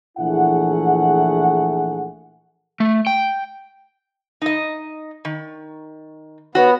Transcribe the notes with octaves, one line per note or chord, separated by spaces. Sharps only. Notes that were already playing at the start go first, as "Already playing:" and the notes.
A#1 E3 A3 E4 G#4 F#5
A3
G5
D#4 D#5
D#3
B3 F#4 C#5